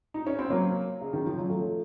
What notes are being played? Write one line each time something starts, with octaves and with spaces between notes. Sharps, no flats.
D#4
C#4
C4
F#3 A#3
C#3
D#3
F3
F#3
F3 A3